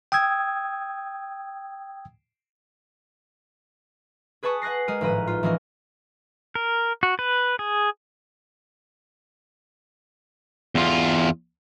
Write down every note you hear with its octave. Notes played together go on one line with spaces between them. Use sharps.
G5 D#6 E6 G#6
G#4 B4 G#5 A5 C#6 D#6
F#5 G#5 F#6 A#6 C7
G#3 A#4 D#7
G#1 A2 F3 B4 A#5 D#7
F4
E3 F3 G#3 A#3 C#4 A#4
A#4
F#4
B4
G#4
E2 F4